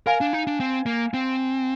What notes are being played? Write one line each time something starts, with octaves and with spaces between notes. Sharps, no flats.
A#4 F5 G#5
D4
D#4
D4
C4
A#3
C4